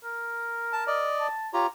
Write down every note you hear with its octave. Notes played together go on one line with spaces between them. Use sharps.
A#4
A5
D5 D#5
A5
F4 G4 C#5 A#5